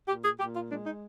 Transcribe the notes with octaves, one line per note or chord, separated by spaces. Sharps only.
A#2 G4
G#4
A#2 G4
F4
G#3 D4
D#4